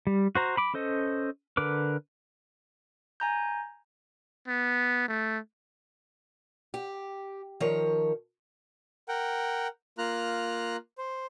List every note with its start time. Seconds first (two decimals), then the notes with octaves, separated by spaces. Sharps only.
0.07 G3
0.35 F#4 C5 A#5
0.57 B5 D6
0.74 C#4 A4 C5 D#5
1.57 D3 A#4 B4 D6
3.20 G#5 A#5 G6
4.48 B3
5.08 A3
6.74 G4
7.60 D#3 F3 A#4 C#5
9.09 A#4 F#5 G5
9.98 A#3 F4 A#5 F6 F#6
10.98 C5